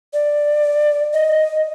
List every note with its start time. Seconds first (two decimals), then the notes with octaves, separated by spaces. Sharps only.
0.13 D5
1.13 D#5